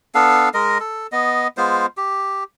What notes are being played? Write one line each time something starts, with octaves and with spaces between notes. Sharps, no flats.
B3 D4 A4 F5
G#3 A#4 D#5
A4
B3 D#5
G#3 B3 F4 C5
G4